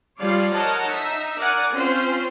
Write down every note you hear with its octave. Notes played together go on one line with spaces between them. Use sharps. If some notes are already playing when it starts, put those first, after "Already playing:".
F3 G3 F4 C#5 D5 F5
A#4 C#5 D#5 F#5 A5
D#4 E5
A#4 D5 F#5 G#5
C4 C#4 F4 C5